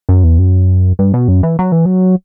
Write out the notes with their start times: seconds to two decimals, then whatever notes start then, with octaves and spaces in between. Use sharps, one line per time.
0.09 F#2
0.24 E2
0.39 F#2
0.99 G2
1.14 B2
1.28 F#2
1.43 E3
1.59 F#3
1.72 E3
1.86 F#3